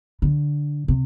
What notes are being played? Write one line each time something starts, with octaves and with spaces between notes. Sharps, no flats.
D3
C3